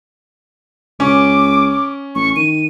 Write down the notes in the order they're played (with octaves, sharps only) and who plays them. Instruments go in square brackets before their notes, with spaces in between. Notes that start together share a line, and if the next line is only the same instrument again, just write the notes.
[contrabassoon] C#2 [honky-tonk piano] C#4 [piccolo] D6
[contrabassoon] A1 [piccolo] C#6
[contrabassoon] D#3 [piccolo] D#7